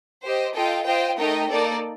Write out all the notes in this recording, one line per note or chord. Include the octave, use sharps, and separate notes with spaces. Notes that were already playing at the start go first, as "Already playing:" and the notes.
G4 C5 D#5
F4 A4 D#5 G5
F4 C5 D#5 G5
A3 D#4 A#4 D#5 G5
A#3 D#4 A4 D5